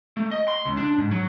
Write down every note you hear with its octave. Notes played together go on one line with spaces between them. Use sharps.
A3
D#5
C6
C#2
D4
G#2
F#3